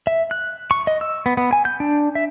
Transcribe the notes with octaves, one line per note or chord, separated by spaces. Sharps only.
E5
F#6
C#6
D#5
E6
B3
B3
G#5
G6
D4
E5